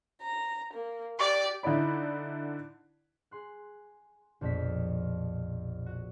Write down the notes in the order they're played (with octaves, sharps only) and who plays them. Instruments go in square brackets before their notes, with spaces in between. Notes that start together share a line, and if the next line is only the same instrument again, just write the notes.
[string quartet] A#5
A#3
[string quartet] G4 [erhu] D5
[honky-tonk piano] D3 D#4 E4 D5 B5
[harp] G#4 C6 F#6
A#1 F2 B2 B4 B6
F#4